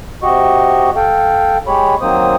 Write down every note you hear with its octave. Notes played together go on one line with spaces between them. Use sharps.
C3 F#4 G4 D#5 C#6
A4 F5 G5
G#3 G4 C#5 B5
D#3 F#3 A#3 C4 C5 D#6